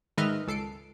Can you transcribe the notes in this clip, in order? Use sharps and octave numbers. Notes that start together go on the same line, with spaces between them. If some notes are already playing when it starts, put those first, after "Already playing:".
G#2 D#3 B4 D#5 E5 F6
C#2 A4 C7 D7